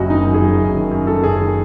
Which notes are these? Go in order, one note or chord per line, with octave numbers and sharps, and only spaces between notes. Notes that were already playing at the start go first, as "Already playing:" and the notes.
Already playing: F#1 F#2 F#3 F#4 D#5 E5
D#3 D#4
F#2
G#4
F#3
F#1
D#3
F#2
F#3 A4
F#1 G#4
D#3